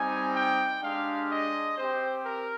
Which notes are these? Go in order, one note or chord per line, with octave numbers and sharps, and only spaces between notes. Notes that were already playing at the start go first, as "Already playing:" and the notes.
Already playing: G3 C4 D#4 G#5
G5
G#3 D4 G4 F5
D#5
C4 G4 C5
A#4